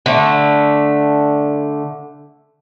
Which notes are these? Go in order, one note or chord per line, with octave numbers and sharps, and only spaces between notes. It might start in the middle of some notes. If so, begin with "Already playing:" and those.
D3 A3